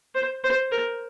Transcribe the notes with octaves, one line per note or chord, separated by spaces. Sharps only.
C5
C5
A#4